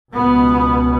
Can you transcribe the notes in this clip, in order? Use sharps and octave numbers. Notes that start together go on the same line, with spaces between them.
C#2 B2 B3